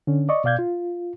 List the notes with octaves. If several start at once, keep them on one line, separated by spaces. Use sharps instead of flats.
D3 C#4
D5 D#5 C#6
B2 D5 F5 G6 G#6
F4